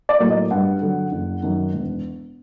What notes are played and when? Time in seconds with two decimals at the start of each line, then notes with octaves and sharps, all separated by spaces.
0.09 D5
0.20 A2 F#3 A#3
0.30 D#5
0.51 G2 F#5
0.81 D3 F#3
1.12 F#1
1.43 F#2 D#3
1.74 E1